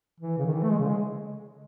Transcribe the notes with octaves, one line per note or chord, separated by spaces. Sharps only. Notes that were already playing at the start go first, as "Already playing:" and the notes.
E3
C#3
D#3
E3
A3
G#3
C#3
G#3